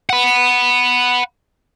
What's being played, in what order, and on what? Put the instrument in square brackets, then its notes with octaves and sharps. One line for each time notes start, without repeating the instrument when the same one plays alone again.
[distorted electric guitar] F#5 B5